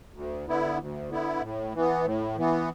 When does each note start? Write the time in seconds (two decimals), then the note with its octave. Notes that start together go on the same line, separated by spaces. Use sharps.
0.14 D2
0.47 D3 B3 E4
0.78 D2
1.09 D3 B3 E4
1.42 A2
1.74 E3 B3
2.05 A2
2.37 E3 B3